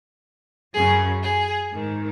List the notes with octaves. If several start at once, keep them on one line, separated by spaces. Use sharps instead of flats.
F#2 C#3 G#4
G#4
G#2 D#3